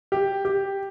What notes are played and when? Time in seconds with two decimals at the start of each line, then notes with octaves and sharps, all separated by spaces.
0.12 G4
0.45 G4